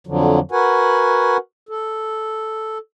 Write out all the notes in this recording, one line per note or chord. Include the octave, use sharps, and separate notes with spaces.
F2 D3 F3 F#3
F#4 A#4 B4 F#5 G#5
A4